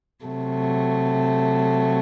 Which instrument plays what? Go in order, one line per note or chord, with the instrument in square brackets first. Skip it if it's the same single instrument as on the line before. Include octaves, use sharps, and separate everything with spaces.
[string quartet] C3 F#3 A3